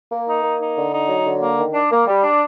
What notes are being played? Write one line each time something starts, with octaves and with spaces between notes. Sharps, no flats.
A#3
D#4
A#3
D#4
D3
D#4
F#3
D3
A#3
D#3
D4
A#3
G3
D4